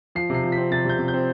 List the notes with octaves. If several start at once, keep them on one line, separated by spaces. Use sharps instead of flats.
F3 C7
C3 C7
F3
B6
C4
C3 A6
C3 G6
C3
G6
C4